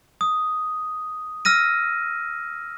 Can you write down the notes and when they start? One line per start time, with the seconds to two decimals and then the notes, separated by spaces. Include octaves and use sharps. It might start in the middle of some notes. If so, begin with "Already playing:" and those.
0.21 D#6
1.45 E6 F6 A#6 D#7